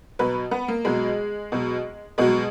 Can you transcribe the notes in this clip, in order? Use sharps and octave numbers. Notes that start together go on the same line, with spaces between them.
B2 F#3 B4
B3
A#3
B2 F#3 G#3
B2 F#3
B2 F#3 G#3